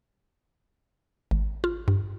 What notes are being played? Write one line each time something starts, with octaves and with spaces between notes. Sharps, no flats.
G#1
F4
G2